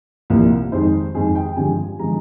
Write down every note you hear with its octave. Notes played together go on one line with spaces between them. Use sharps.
C2 A#2 F3 A#3
F2 D#3 G#3 C5
F2 D#3 G#3 G#4
G5
G2 D3 F3 G#3 G#5
D3 F3 G#3 A#5